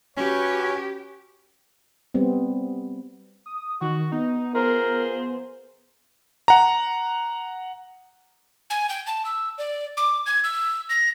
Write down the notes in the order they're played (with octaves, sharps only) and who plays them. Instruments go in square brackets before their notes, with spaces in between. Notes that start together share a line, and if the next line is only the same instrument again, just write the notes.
[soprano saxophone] C#4 [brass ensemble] F#4 B4 C#5 [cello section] G4
[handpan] G3 B3 C4
[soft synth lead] D#6
[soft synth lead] D#3 [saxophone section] F#4
[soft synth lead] B3 [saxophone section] D#4
[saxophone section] F3 G#4 C5 [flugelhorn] A#4
[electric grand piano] F#5 A#5
[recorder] G#5
G5
A5
E6
D5
D6
G#6
E6
A#6